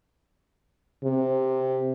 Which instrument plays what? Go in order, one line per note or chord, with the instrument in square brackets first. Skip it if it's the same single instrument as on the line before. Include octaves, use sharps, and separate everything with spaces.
[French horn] C3